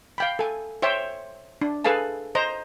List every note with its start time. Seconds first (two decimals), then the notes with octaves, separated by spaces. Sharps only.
0.18 F5 G5 B5
0.39 A4 G#5
0.82 C5 C#5 E5 G5
1.61 D4
1.84 G#4 A4 B4 F5 G#5 A5
2.35 C5 D#5 A#5